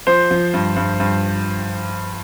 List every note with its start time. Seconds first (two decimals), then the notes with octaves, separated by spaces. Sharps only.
0.07 F3 C5
0.31 F3
0.54 G2
0.76 G2
1.00 G2